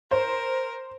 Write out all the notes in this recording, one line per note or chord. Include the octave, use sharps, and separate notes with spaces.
A#4 C5